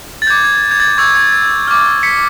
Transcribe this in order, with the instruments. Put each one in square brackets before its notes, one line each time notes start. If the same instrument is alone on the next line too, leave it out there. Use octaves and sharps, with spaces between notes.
[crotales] A6
D6 G6 G#6
G#6
G#6
A6
C#6 E6 G6 G#6
G#6
G#6
D6 F6
B6 C#7